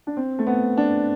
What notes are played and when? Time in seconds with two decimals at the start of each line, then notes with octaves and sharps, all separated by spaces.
0.07 D4
0.17 C4
0.39 A3
0.47 B3
0.77 D4